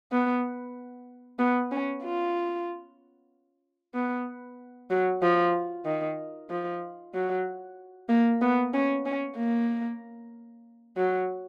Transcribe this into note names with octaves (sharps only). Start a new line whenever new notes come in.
B3
B3
C#4
F4
B3
F#3
F3
D#3
F3
F#3
A#3
B3
C#4
C#4
A#3
F#3